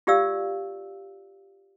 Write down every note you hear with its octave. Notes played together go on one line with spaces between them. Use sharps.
F4 G4 D5 F5 E6